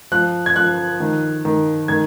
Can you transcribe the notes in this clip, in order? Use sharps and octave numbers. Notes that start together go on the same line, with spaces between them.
F3 F#6
G#6
F3 F#6
D#3
D#3
D#3 G#6